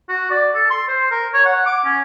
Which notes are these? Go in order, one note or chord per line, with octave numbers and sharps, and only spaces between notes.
F#4
D5
A4
C6
C5
A#4
C#5
F#5
D6
C#4